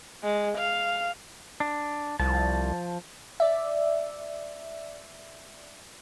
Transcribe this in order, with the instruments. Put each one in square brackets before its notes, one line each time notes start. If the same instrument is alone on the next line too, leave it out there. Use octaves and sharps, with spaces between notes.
[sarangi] G#3
F5
[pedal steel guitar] D4
[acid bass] C2 [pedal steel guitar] F3 A5
[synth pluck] D5 E5